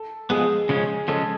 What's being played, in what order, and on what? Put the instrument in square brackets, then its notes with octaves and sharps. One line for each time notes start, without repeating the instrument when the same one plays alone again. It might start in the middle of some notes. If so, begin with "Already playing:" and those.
Already playing: [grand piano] A4
[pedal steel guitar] F3 G#3 B3 [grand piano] G#4
[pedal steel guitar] C#3 F3 G#3 C#4
[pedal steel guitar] C#3 F3 G#3 C#4 [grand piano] A4